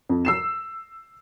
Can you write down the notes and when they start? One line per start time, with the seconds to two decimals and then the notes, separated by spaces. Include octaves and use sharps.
0.09 F2
0.25 E6 C7 E7